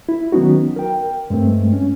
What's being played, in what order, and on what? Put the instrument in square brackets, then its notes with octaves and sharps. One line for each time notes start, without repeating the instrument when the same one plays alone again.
[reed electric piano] E4
D#3 F#3 B3 C#4 D#4 F#4
A#4 G5
G2 G#3 A3 C4
C#4